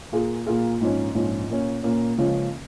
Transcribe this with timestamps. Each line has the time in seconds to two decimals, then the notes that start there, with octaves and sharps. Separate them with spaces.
0.12 A#2 A#3 F4 G#4
0.46 A#2 A#3 F4 G#4
0.80 A#1 G#2 F3 C#4
1.15 A#1 G#2 F3 C#4
1.49 A#2 A#3 C#4
1.83 A#2 A#3 C#4
2.18 C#2 C#3 F3 A#3 C#4